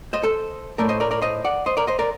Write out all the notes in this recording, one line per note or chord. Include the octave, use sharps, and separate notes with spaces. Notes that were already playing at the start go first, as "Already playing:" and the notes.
C5 D#5
A4 C5
A2 A3 A#4 D5
C5 D#5
A#4 D5
A#4 D5
C5 D#5
D5 F#5
C5 D#5
A#4 D5
C5 D#5
A#4 D5